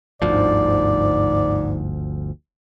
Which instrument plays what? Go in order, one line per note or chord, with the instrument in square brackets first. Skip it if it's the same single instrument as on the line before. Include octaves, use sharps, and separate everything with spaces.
[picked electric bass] G1 D2 F3 [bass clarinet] G#2 [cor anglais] D5